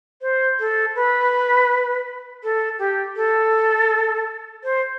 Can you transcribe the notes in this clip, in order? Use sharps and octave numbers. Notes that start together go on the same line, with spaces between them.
C5
A4
B4
A4
G4
A4
C5